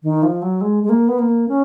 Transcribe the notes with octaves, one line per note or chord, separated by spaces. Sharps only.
D#3
F3
F#3
G#3
G#3
A#3
B3
A#3
C#4